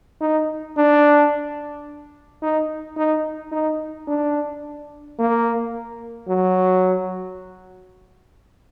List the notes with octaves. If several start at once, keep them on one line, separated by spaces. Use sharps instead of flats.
D#4
D4
D#4
D#4
D#4
D4
A#3
F#3